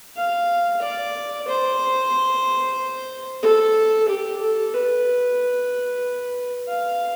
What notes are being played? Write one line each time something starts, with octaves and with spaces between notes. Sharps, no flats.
F5
D5
C5
A4
G4
A4
B4
F5